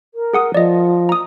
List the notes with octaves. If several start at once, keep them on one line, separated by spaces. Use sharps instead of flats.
A#4
G#4 F#5 D#6
F3 D5 D#5
A#5 D#6